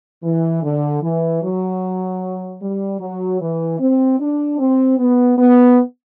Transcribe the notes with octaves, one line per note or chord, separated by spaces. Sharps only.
E3
D3
E3
F#3
G3
F#3
E3
C4
D4
C4
B3
B3